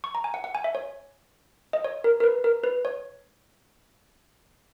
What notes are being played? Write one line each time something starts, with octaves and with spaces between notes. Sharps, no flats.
C#6
A#5
G#5
F#5
F#5
G#5
E5
C#5
D#5
C#5
A#4
A#4
B4
A#4
B4
C#5